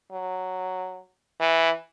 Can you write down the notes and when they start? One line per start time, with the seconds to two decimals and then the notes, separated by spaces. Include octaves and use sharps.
0.12 F#3
1.40 E3